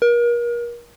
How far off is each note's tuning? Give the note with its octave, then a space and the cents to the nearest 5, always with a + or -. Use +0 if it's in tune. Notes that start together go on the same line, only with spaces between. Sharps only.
A#4 +35